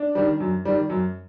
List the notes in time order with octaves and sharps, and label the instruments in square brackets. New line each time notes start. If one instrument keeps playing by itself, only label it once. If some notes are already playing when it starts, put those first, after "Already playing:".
Already playing: [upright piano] D4
D#3 G3
F#2
D#3 G3
F#2